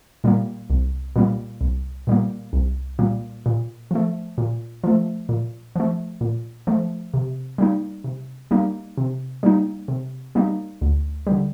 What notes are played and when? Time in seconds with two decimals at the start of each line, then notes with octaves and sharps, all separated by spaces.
0.24 A#2 G3 A#3
0.70 C2
1.16 A#2 G3 A#3
1.61 C2
2.07 A#2 G3 A#3
2.53 C2
2.99 A#2 G3 A#3
3.46 A#2
3.91 F3 A3
4.38 A#2
4.84 F3 A3
5.29 A#2
5.76 F3 A3
6.21 A#2
6.67 F3 A3
7.14 C3
7.58 G3 A#3 D#4
8.04 C3
8.51 G3 A#3 D#4
8.97 C3
9.43 G3 A#3 D#4
9.88 C3
10.35 G3 A#3 D#4
10.81 D2
11.27 G3
11.32 D3